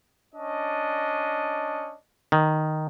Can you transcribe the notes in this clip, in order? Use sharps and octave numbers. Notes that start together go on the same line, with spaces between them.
C#4 D4 D#5
D#3